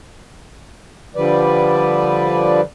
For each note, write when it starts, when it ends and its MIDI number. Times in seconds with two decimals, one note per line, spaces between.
1.16 2.61 50
1.16 2.61 53
1.16 2.61 55
1.16 2.61 71
1.16 2.61 74